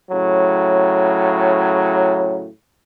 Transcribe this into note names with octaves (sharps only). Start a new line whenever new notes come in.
A2 C#3 F#3